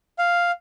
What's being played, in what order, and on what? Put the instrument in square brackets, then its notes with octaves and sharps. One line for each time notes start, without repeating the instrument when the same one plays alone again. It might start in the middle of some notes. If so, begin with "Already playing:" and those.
[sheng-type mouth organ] F5